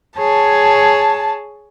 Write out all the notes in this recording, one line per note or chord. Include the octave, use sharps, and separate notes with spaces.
G#4 C#5 A5